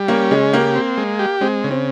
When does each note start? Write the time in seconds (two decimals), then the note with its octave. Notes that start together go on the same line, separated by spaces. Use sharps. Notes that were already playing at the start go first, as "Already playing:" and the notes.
Already playing: G3
0.08 A#3 C#4
0.31 C#3 G#3
0.53 A#3 G4
0.75 C4
0.97 G#3
1.19 G4
1.41 G#3 C4
1.64 C#3
1.71 C4